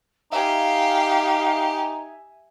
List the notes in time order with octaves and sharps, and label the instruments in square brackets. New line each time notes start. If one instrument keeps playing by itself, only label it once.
[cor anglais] D#4 [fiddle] G4 [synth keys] E5 G#5 [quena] F5